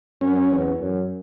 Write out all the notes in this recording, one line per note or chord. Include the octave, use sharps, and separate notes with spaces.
F#2 C#4
E2
F#2